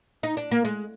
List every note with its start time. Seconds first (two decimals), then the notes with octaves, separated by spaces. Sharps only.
0.23 D#4
0.37 D4
0.51 A#3
0.65 G#3